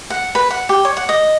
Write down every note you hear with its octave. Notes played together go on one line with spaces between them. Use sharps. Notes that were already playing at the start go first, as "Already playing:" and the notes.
F#5
B4
F#5
G4
C#5
F#5
D#5